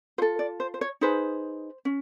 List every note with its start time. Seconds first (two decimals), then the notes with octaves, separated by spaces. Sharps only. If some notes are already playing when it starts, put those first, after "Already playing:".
0.18 F4 A4 C5
0.39 D5
0.60 C5
0.74 C5
0.81 C#5
1.01 D#4 G#4 B4 C5
1.85 C#4